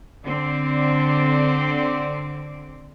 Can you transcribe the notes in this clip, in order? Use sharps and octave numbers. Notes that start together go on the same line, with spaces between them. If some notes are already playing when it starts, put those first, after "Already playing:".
D3 C4 D5